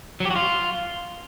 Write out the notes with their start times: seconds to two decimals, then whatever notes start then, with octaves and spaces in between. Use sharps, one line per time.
0.20 F#3
0.25 G4
0.30 F#4
0.36 F4